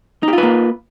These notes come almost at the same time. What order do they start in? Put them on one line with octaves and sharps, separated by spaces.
D#4 G4 F4 B4 A#3